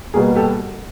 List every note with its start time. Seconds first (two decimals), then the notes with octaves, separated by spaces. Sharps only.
0.14 B2 G3 A#3 G#4
0.36 G4 A4